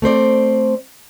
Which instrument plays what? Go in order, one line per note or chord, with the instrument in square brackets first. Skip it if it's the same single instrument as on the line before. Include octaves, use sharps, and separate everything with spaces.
[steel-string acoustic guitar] A3 C4 C5 D5